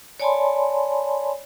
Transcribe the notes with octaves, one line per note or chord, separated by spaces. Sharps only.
C#5 D5 G#5 A5 B5 C6